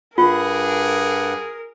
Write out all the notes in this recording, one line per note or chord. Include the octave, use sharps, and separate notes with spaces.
G2 F4 G#4 A#4 F#5